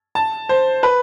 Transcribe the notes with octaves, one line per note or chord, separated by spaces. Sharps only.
A5
C5
B4